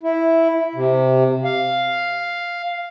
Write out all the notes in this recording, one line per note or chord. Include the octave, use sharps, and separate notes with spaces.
E4
C3
F5